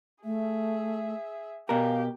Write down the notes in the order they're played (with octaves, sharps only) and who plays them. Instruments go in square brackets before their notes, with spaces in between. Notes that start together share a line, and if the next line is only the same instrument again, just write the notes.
[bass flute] A3 [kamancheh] G#4 E5
[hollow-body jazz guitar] B2 A#4 [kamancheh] G4 [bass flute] F5